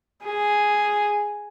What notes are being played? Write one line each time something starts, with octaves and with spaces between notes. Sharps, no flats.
G#4